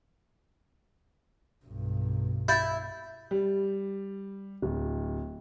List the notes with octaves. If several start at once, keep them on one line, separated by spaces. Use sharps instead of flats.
B1 G2
E4 G6 A6
G3
D1